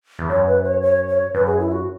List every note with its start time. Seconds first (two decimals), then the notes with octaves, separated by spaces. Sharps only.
0.19 E2
0.29 F#2 C#5
0.47 B4
0.64 C#5
0.82 C#5
1.08 C#5
1.34 F#2 B4
1.47 G#4
1.60 E4
1.72 F#4